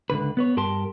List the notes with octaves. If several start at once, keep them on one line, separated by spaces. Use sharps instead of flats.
C#2 G2 D3 B4
B3 B4 C#5
G2 G4 A#4 A5 C6